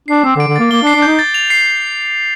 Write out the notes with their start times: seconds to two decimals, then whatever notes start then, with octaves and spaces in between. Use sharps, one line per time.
0.08 D4 C7
0.24 C4 D6
0.36 D3
0.40 D7
0.48 D3
0.56 A#3 A6
0.71 A#3 G7
0.83 D4
0.87 C7
0.95 D4
1.02 D#4 G6
1.19 A6
1.34 F7
1.50 C7